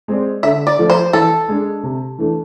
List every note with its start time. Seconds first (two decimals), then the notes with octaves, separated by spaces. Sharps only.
0.08 G#3 C4 G#4 D5
0.43 D3 E5
0.67 D5
0.78 F3 A3
0.90 C5
1.13 E3 A4
1.49 G#3 D4
1.83 C3
2.18 E3 A3 D4